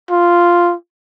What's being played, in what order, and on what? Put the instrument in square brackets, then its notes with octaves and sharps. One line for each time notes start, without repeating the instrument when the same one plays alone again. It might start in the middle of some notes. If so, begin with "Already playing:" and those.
[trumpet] F4